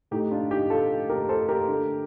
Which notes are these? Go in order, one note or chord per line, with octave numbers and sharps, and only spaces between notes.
A2 A3 D#4 G4
D4 F4
D#4 G4
F4 A4
G4 A#4
A4 C5
G4 A#4
D3 A3